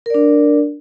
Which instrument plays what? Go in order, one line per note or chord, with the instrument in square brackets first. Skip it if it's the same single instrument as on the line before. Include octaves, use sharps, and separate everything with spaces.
[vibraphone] A#4
D5
D4